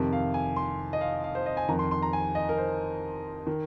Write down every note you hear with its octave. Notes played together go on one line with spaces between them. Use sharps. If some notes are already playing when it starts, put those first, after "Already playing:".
Already playing: F2 C3 D#3
F5
G#5
C6
D#5
F5
F5
C5
D#5
G#5
F2 D#3 A#5
C6
C6
A#5
G#5
D#5
A#4
C5
D#3